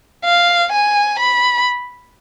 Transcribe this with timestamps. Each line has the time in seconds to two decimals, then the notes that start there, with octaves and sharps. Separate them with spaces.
0.25 F5
0.72 G#5
1.19 B5